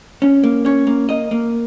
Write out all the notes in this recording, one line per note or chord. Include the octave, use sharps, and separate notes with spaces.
C#4
A#3
C#4 C#5
A#3
A#3 D#5
A#3